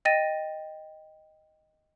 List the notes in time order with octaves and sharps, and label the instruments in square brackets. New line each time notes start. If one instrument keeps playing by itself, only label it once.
[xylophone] D#5 G5 A6 A#6 D#7